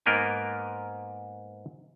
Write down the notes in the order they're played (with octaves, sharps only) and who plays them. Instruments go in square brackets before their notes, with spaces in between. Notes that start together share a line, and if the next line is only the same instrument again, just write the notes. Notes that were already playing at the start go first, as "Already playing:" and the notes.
[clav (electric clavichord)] G#2 A#3 B3 A#4 G5 G#5